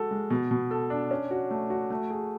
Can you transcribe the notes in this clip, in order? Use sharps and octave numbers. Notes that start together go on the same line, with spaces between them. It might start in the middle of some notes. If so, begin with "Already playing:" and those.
Already playing: G#3 F#4 A4
G#3
B2
B2
A4
D4
C#4
F#4
A3
F#4
A3
G#4